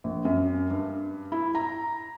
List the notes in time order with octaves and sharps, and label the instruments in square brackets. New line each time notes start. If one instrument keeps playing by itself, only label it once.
[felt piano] A#1
F#2
G2
E4
A#5